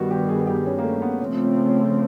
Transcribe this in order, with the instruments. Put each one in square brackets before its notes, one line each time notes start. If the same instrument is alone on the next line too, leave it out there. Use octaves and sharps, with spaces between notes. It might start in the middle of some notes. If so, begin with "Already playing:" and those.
Already playing: [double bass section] G2 D#3 G3 B3 [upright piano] F#4
[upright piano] G4
G#4
G4
C#4
A#3
A3
B3
[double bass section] C#3 F3 A3 C4 [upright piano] C#4
[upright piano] C#4
C#4